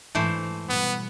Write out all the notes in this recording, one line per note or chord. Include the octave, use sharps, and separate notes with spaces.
G#2 E3 A3 C5
B2 G3 B3